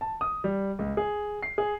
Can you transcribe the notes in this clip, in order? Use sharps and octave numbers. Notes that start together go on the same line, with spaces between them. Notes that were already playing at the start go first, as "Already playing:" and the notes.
A5
D#6
G3
C#2
G#4
C7
G#4